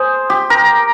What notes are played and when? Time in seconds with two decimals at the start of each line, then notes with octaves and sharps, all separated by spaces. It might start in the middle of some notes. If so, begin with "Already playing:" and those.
Already playing: G#4 C5
0.30 G4
0.50 A#4